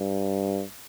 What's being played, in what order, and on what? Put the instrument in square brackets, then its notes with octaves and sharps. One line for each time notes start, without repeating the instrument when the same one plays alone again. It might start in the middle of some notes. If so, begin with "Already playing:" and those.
Already playing: [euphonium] G2